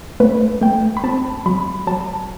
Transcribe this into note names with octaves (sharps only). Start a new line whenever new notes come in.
A3 B4
A3 G5
B5
C4 A5
F#3 B5
F#3 A5